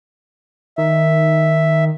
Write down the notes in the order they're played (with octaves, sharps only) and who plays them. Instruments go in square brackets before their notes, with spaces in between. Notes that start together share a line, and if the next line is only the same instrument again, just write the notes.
[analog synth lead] D#3 [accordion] E5